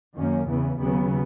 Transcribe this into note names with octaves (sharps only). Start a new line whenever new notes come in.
F#2 D#3 A#3 C#4
E2 C#3 E3 B3
D#2 C#3 F#3 B3